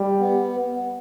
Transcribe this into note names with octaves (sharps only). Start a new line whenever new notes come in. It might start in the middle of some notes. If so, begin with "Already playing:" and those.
Already playing: G3
B3